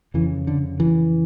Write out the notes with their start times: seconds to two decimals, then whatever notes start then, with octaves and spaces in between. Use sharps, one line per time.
0.14 F2 C#3 E3
0.47 D3
0.80 E3